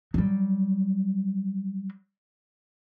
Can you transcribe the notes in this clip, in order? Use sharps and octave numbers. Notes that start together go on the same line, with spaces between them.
F#3 G3